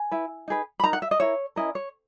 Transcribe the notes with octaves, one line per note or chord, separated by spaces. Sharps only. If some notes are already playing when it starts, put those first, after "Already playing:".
Already playing: G#5
E4 B4
D#4 G#4 B4
B5
D#4 A#4 A#5
F#5
E5
D#5
E4 A#4 C#5
C#4 E4 A#4 D#5
C#5